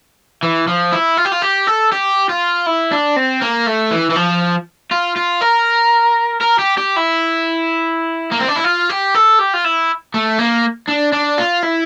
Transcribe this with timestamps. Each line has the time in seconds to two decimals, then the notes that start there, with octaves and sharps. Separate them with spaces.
0.43 E3
0.68 F3
0.92 E4
1.17 F4
1.25 G4
1.32 F4
1.42 G4
1.67 A4
1.92 G4
2.29 F4
2.67 E4
2.92 D4
3.16 C4
3.42 A#3
3.67 A3
3.91 E3
4.10 E3
4.16 F3
4.91 F4
5.16 F4
5.41 A#4
6.41 A#4
6.59 G4
6.78 G4
6.96 E4
8.31 A#3
8.40 C4
8.48 D4
8.56 E4
8.64 F4
8.89 G4
9.15 A4
9.39 G4
9.53 F4
9.64 E4
10.14 A3
10.39 A#3
10.89 D4
11.13 D4
11.38 F4
11.63 E4